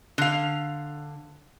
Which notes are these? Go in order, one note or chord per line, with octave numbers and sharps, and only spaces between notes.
D3 F5